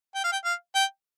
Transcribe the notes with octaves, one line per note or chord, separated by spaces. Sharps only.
G5
F5
G5
F5
G5